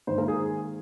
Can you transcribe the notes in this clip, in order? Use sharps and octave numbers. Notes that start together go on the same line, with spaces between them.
G#2 D#3 A#3 C5
A#4
G#4